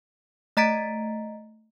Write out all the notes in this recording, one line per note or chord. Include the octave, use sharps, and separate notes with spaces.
A3 D#5 A#5 A6 B6 D7